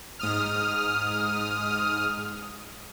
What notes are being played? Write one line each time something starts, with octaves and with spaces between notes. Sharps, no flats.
G#2 D#6 F6